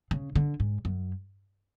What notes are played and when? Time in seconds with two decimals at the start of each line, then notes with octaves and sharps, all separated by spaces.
0.11 C#3
0.36 D3
0.60 G#2
0.85 F#2